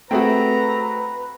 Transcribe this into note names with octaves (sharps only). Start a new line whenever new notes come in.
A3 C4 F#4 G#4 B4 G5 A#5